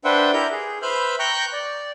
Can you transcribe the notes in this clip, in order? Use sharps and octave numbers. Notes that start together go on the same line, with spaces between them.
D4 B4 C5 E5 F#5 G5
E4 G4 A#4 G6
G#4
B4 C5 E5 B5 F6 G6
G5 A#5 C#6 F#6 G6
D5